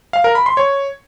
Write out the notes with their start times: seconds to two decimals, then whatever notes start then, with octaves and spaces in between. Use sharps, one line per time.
0.13 F5
0.24 A#4
0.35 B5
0.46 C6
0.57 C#5